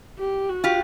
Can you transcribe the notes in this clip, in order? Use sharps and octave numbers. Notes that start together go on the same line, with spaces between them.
G4
F#4
F4 G4